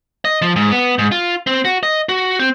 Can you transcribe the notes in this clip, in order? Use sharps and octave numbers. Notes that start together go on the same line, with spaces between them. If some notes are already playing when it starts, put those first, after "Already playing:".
D#5
F3
G#2
B3
G#2
F4
C4
F#4
D#5
F#4
C4